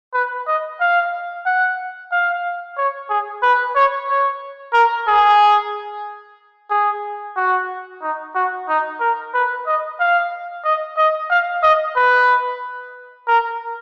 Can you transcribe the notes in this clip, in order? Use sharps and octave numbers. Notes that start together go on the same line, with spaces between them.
B4
D#5
F5
F#5
F5
C#5
G#4
B4
C#5
C#5
A#4
G#4
G#4
F#4
D#4
F#4
D#4
A#4
B4
D#5
F5
D#5
D#5
F5
D#5
B4
A#4